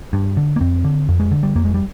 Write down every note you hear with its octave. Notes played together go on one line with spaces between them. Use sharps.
G2
D3
A#3
F2 C4
D3
F2
G#3
D3
G3
F2 A#3
G#3
G3